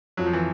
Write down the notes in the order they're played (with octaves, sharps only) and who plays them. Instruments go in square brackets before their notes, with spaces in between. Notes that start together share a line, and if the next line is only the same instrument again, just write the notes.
[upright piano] F2 [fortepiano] F#3
[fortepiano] F3
E3